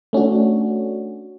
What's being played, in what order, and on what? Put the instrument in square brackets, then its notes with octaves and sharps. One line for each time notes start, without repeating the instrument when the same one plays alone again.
[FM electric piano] A3 C#4 D4 F#4